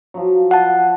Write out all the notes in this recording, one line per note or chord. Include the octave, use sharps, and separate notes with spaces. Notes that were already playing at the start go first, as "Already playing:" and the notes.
F3 F#3
F#5 A5